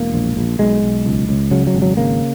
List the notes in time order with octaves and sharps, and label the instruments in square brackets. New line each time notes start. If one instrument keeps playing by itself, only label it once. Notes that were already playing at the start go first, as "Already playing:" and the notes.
Already playing: [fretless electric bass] E1 A#3
A#1
A#1
B1 G#3
B1
C#2
C#2
C#3 F#3
F#3
G#1
F#3
C#3 A#3